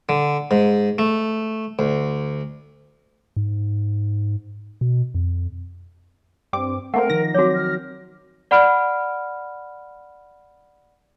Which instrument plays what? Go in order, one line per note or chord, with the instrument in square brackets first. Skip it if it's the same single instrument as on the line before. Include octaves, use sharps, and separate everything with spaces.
[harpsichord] D3
G#2
A3
D2
[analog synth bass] G#2
B2
F2
[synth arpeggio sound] G2 C4 D6
[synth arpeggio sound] A3 A#3 C4 [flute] A#4 [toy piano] F#5
[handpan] D#3 F3 D#4 [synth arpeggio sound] A#6
[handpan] F#3 C4 [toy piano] F#4 C#5 [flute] D6
[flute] F6
[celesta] D5 F#5 B5 F6 D7